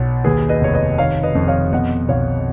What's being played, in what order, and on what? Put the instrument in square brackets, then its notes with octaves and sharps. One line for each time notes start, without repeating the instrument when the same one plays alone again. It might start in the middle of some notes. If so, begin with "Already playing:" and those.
Already playing: [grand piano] B1 B2 C#5 F#5
D#2 G#4 B4
B4 D#5
F1 C#5
B4 D#5
D#3 C#5 F5
B4 D#5
F2
C#5 F5
B2 D#5 F#5
B1 C#5 F5